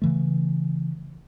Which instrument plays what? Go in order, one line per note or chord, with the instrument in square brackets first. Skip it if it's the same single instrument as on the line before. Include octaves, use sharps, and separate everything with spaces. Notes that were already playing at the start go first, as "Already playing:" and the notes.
[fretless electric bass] C#3 E3 A3